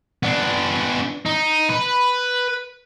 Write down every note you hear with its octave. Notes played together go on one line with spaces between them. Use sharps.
B3 D4
D#4
B4